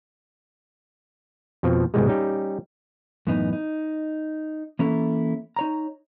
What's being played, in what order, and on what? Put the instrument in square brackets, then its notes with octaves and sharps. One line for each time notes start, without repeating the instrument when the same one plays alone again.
[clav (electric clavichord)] F2 B2 F3
C2 G#2 B2 D#3 G3 G#3
G3 C#4 D#4 G4
[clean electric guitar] F#2 A2 E3 B3 D#4
D#4
E3 A#3 C#4 E4 A4
D#4 C#5 A#5